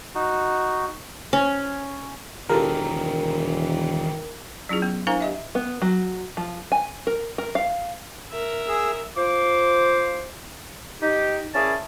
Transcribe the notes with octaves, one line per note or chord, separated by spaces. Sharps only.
D#4 F#4
C#4
E1 D#3 E3 F4 G4 A4 A#4
F#3 C#4 E4 F4 G#4
B3
D4 E4 A#4 C5 F5 A#5
G4 D#5 E5
B3
F#3
F3
G#5
A#4
A#4
F5
A#4 E5
G#4 E6
F4 C5 D6
D#4 G4
C#4 E4 G#4 A#4 D5 A5